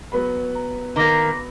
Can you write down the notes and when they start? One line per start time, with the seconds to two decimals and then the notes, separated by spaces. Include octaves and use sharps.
0.12 F#3 B3 B5
0.55 A#5
0.96 D#3 A#3 A#5 D6 A#6